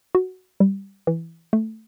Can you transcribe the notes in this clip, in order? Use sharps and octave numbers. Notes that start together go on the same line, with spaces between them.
F#4
G3
E3
A3